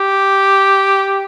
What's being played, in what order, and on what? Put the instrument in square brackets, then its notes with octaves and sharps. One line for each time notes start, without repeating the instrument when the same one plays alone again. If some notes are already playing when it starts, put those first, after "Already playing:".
Already playing: [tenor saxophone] G4